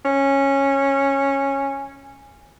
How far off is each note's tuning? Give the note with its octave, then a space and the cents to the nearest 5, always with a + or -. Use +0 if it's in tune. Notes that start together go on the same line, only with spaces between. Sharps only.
C#4 -10